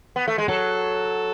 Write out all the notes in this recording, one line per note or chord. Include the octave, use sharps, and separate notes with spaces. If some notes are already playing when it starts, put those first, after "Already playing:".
B3
A3
G#3
F#3 A4